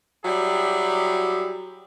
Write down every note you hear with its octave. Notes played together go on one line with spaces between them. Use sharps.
F#3 G3 E4 G4 G#4